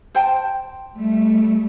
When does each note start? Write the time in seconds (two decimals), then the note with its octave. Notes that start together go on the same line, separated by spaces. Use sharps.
0.15 C5 G5 A5
0.97 G3 A3